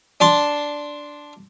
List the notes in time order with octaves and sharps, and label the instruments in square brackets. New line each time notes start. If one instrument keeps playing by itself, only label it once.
[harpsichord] D4 A5 C6